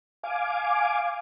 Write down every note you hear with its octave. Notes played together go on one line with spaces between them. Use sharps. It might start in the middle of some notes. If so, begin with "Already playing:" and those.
F5 G#5 D6